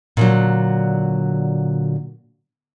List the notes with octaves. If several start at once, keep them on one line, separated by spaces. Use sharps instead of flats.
A#2 D3 F#3